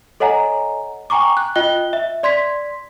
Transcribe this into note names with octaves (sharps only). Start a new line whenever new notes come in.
A4 C#5 D#5 F#5 G#5 A#5
G5 G#5 A#5 C#6 D6
F#6
F4 D#5 G5 F#6 G7
E5
D5 C6 G#6 B6